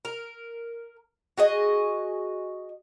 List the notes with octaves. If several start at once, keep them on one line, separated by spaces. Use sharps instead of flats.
A#4
F#4 G#4 D#5